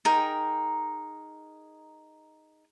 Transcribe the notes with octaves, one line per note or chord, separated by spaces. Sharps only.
D#4 G#4 A#4 G5